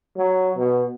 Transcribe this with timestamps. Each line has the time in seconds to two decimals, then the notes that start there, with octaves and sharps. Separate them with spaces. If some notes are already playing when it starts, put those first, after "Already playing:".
0.17 F#3
0.57 B2